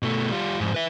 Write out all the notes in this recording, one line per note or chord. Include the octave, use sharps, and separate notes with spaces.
B2 A3
G3 F4
F2 G#2
B4 E5